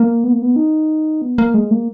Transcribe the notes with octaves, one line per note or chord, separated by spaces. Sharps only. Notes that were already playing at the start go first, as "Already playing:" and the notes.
Already playing: A#3
B3
A#3
B3
D#4
B3
A#3
G#3
A#3